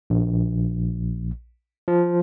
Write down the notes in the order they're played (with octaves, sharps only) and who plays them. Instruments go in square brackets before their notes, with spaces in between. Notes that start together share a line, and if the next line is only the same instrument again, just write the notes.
[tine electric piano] A#1
F3